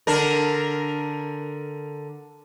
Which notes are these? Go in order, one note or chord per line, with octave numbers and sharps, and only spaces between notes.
D3 D4 A#4